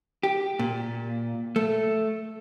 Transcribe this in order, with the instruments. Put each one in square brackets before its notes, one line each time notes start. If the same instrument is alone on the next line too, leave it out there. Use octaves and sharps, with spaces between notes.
[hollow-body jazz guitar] G4
A#2
A3